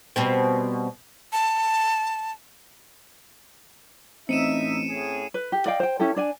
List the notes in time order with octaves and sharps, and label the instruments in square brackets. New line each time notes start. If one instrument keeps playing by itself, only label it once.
[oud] B2 G3 C4
[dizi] A5
[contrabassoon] A1 [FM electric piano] C4 [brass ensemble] D#4 E5 [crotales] C#7 D#7 E7
[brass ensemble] A2 C#4 G#4
[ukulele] B4
G4
D5 D#5 F5 G5
C5 G5
C#4 E4 G4 A4
D4 D5 G#5